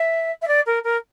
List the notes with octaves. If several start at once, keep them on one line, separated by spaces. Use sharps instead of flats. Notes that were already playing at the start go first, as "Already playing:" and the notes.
Already playing: E5
E5
D5
A#4
A#4